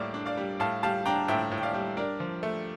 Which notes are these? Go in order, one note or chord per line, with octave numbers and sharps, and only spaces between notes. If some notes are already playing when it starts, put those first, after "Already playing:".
Already playing: A2 G3 A#3 D5 F5
D4
D5 F5
G3
A2 F5 A5
G3 F5 A5
D4 G5 A#5
A2 E5 G5
A2
G5
D5 F5
G3
D4 A#4 D5
F3
A3